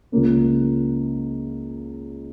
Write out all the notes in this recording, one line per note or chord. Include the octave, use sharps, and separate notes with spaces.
C#2 C#3 A#3 C#4